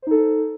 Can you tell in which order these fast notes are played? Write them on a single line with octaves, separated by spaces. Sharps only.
C5 D#4 A4